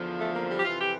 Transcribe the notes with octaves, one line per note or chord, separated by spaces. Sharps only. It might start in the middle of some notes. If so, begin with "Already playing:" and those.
Already playing: E2 D3 F3
A3
A#3
G3
G4
F2 C3 E3 F4
G4